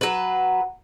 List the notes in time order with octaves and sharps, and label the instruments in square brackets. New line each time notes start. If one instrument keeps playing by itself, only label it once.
[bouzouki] F#3 B4